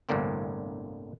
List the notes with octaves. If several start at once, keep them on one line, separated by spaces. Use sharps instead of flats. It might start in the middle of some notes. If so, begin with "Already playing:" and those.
G1 C2 A2 D3 A#3 C4